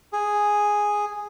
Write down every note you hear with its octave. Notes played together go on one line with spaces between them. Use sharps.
G#4